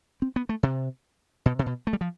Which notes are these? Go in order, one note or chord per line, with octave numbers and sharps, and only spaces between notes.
C4
B3
A3
C3
B2
C3
B2
A3
G3
F3